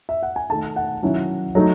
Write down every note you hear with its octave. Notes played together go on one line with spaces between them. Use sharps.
E5
F#5
G#5
D#3 A3 D#4 A5
F#5
D#3 F#3 C#4 E4
F#3 A3 D#4